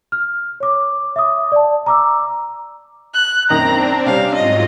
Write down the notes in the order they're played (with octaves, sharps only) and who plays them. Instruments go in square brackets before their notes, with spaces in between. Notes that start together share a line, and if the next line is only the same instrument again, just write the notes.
[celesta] F6
C#5 D6
E5 D6 D#6
D5 A5
A#5 D6 E6
[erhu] F#6
[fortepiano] F#2 D#3 D#5 [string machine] C4 D4 [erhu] A#5
[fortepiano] C3 G3 C#4 [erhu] F5
[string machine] G#2 F#3 F4 [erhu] D#5